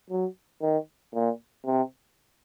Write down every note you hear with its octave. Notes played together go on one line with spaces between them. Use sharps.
F#3
D#3
A#2
C3